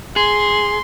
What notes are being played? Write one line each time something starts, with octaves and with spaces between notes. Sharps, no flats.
G#4 C6